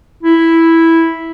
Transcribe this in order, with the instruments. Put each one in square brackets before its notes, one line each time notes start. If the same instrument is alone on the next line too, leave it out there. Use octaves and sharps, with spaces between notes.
[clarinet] E4